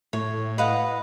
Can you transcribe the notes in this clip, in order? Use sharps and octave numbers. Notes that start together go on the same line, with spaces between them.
A2 C#5
B4 D#5 F5 F#5